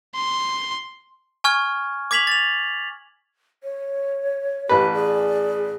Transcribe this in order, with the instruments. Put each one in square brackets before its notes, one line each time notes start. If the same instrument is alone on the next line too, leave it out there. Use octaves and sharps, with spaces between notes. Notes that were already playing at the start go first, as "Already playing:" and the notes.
[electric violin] C6
[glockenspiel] G#5 C#6 F6 G#6
D6 G#6 B6 F7 F#7
A6 F7
[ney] C#5
[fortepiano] A1 B4 [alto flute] G4
[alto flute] G#4 [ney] D5